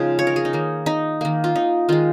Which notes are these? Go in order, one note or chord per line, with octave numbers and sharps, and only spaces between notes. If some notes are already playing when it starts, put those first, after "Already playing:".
Already playing: C#3 F3 G#3 D#4 F4 G#4
C#5
A#4
G#4
D#4
D#3 A#3
D#4
D#3 A#3
F4
D#4
D#3 G#3 F4